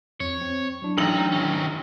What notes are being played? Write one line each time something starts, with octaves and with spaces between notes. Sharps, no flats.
F2 C#5
C4
F#3 D4 E4
A1 D#4 A#5 F#7
D#3 C#4